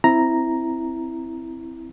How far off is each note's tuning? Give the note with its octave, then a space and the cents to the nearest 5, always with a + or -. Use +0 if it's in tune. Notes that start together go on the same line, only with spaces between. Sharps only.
C4 +0 E4 +0 A#5 +0